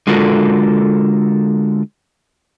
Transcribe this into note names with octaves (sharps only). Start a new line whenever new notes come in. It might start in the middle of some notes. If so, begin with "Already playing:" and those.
D3 G#3 F4 F#4 A4 A#4